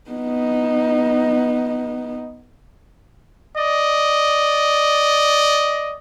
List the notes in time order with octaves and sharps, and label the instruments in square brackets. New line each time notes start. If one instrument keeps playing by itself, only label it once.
[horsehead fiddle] B3 D#4
[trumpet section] D5 D#5